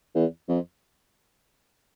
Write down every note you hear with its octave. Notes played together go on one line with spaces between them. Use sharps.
E2
F2